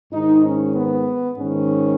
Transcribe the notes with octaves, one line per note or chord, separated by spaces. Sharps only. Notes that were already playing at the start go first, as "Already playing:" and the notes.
G#2 D#3 D#4
C#4
B3
G#2 D#3 C#4